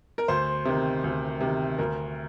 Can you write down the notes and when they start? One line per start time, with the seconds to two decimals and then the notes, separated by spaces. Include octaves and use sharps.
0.18 A#4
0.28 D2 C5
0.65 C3 D#3
1.04 D2
1.40 C3 D#3
1.78 D2 A#4